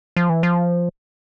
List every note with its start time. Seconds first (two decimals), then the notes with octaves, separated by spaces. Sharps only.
0.16 F3
0.30 E3
0.43 F3